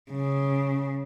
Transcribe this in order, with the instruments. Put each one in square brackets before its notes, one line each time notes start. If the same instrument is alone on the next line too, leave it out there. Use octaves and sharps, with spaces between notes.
[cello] C#3